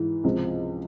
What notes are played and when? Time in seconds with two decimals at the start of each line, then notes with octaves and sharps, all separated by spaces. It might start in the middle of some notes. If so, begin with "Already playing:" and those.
Already playing: G#2 E3
0.24 C#2 C3 F3